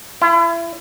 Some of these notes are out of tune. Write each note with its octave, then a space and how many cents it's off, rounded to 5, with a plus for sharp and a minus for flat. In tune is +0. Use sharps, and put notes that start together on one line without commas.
E4 +35